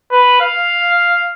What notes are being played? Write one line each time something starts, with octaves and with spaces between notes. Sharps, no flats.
B4
F5